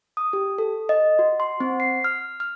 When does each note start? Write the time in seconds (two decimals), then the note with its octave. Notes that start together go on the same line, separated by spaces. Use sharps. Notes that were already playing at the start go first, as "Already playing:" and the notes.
0.17 D#6
0.33 G4
0.58 A4
0.89 D#5
1.19 F#4
1.40 C6
1.60 C4
1.80 C7
2.04 F6
2.40 F6